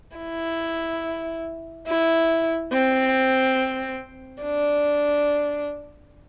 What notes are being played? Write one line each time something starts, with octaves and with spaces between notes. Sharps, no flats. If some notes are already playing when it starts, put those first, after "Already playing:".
E4
E4
C4
D4